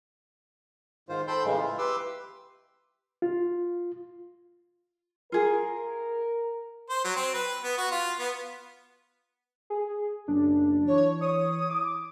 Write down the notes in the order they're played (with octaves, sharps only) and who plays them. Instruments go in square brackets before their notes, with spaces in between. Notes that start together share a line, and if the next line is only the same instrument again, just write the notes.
[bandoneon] G#2 D#3 F4 C5
A4 C5 G5 B5 C6 G6
A2 C#3 E3 G#3
E4 F4
G4 B4 C6 D6 E6
[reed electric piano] F4
[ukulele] F4 G#4 [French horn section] A#4
[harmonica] C5
F#3
C4
B4
B3
F#4
F4
B3
[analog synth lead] G#4
[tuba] F#1 [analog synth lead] D4
[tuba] E3 [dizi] C#5
[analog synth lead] C#5 [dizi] D#6
[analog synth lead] D6